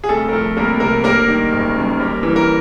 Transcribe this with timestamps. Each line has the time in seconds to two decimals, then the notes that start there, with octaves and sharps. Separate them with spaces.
0.04 G#4
0.09 C2 A3 A4
0.29 A#4
0.33 F3 A3 A4
0.57 C2 A#3 A#4
0.80 C3 A#3 A#4
1.04 G3 A#3 A#4
1.28 D#3
1.52 F#1
1.76 F#2
2.00 G3
2.23 E3
2.36 A#4